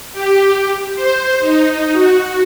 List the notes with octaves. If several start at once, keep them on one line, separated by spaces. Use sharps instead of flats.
G4
C5
D#4
F#4